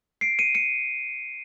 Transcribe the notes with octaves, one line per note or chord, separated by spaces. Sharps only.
C7 D7
C#7 D#7
C#7 D#7